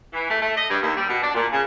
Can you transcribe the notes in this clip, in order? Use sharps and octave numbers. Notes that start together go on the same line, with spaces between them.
E3
A3
A3
D#5
G2
D#2
G3
B2
D4
A#2
C#3